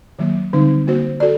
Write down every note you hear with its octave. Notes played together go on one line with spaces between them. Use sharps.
D#3 F#3 A#3
D3 G3 C4 D#4
A#3 F#4 C5
F#4 A4 D5